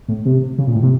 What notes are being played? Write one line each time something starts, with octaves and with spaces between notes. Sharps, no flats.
A2
C3
C#3
A#2
A2
C3